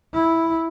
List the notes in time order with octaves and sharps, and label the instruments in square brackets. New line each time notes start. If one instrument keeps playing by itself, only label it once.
[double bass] E4